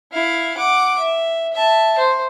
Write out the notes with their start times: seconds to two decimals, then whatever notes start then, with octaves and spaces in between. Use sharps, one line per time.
0.12 E4 F5
0.58 F#5 D6
0.99 E5
1.53 E5 A5
1.98 C5